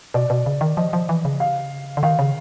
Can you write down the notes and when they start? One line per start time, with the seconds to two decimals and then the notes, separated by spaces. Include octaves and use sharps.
0.14 B2 D5
0.30 B2
0.46 C#3
0.61 D#3
0.77 F3 D#5
0.93 F3
1.09 E3
1.25 C#3
1.40 F5
1.97 D3
2.03 D#3 F5
2.19 C#3